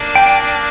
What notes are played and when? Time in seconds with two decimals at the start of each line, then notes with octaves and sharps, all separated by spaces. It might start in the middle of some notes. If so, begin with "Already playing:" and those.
Already playing: A#3 D4
0.15 G5